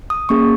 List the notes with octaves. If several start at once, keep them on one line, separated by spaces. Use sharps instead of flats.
D#6
A#3 C#4 G#4 C#6